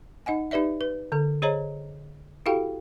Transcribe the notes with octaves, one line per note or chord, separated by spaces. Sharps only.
D#4 D#5 F#5 G#5
D#4 G4 B4 D5 E5
B4
D3 A4
G#4 C5 C#5 D#5 A#5
E4 F#4 G4 A4 F5 G5